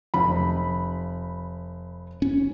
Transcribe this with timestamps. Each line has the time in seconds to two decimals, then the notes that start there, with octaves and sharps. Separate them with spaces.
0.14 F1 B5
2.22 C#4